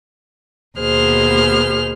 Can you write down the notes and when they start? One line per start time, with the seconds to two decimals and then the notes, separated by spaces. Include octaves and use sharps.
0.78 D#2 B2 B3 G#4 C5 F6